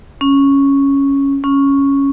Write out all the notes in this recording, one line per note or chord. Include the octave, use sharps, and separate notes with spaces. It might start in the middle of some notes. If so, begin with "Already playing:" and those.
C#4
C#4